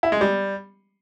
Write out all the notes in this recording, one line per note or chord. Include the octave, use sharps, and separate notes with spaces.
E4
G#3
G3